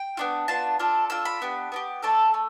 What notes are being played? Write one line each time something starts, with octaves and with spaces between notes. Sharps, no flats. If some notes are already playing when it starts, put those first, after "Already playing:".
Already playing: G5
B3 D4 F4
B3 D4 F4 A5
D4 F4 A4
D4 F4 A4 E6
B5
B3 D4 G4
B3 D4 G4
A3 D4 A4 A5
A3